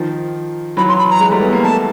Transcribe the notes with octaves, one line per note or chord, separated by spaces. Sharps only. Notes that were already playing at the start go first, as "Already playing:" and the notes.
Already playing: D#3 F3
E3 F#3 B5
C6
B5
A#5
F#3 G#3
G3 A3
A3 B3
G#3 A#3
G3 A3 A5